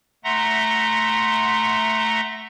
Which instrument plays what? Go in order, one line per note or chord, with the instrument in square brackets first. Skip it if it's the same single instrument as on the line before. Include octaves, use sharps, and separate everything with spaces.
[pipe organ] A3 E5 F#5 A#5 C6 A#6